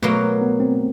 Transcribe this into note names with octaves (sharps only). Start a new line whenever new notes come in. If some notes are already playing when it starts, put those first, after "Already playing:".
B2 F#3 A3 A#3
B3
C4